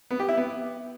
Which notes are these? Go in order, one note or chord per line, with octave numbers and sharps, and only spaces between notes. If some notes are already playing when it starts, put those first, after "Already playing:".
B3
G4
E4
B3